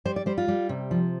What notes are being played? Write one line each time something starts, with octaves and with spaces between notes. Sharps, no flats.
G3 C5
D5
G3 C5
F4
G3
C3
F3